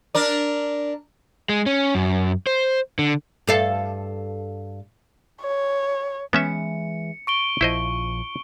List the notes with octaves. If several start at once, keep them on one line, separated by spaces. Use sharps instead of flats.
D4 A#4 D5
G#3
C#4
F#2
C5
D3
G2 A4 F5
C#5
E3 G#3 B3 C#4 E5 C#7
C#6 D7 G7
A#1 F3 E4 C5 D#5